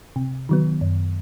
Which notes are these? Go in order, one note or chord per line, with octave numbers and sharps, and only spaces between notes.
C3
D#3 F#3 B3
F#2